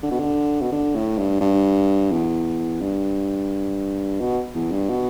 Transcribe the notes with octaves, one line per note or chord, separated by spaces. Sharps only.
D3
B2
D3
B2
D3
A2
G2
G2
E2
G2
B2
E2
G2
B2